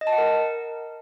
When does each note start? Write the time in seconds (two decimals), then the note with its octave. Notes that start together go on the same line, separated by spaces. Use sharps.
0.01 D#5
0.07 A5
0.13 F#5
0.18 A#4